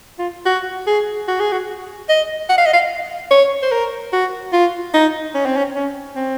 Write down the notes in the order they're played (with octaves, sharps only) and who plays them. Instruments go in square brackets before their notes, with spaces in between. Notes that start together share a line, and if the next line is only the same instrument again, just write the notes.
[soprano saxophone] F4
F#4
G#4
F#4
G#4
F#4
D#5
F#5
F5
D#5
F5
C#5
C5
A#4
F#4
F4
D#4
C#4
C4
C#4
C#4
C4